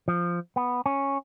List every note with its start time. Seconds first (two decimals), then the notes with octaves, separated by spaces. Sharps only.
0.08 F3
0.56 B3
0.86 C#4